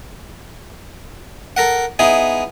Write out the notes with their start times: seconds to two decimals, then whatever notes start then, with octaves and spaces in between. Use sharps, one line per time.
1.57 A4 A#4 F#5
1.99 B3 D#4 E4 G#4